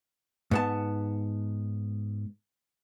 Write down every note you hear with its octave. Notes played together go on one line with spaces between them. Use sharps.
G#2 B3 A5